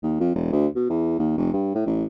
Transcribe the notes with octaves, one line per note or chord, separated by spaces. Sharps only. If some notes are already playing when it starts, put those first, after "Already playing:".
D#2
F2
E1
D2
B2
E2
D#2
F1
G2
A2
A1